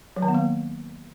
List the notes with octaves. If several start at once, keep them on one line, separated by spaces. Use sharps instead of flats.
F#3
D#3
B3
A#3